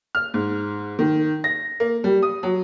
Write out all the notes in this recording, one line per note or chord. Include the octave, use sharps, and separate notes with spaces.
F6
G#2
D#3
A#6
A#3
G3
D#6
F#3